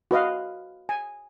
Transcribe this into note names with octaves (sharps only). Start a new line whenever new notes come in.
F#4 B4 D#5 F5
G#5